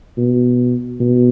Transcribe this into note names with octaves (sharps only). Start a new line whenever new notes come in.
B2
B2